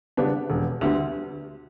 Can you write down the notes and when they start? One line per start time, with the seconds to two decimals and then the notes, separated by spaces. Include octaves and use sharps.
0.17 C#3 G3 B3 D4
0.50 E1
0.81 D2 D3 G3 B3